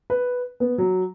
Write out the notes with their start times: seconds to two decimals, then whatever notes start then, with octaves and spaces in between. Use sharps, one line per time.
0.10 B4
0.60 B3
0.78 F#3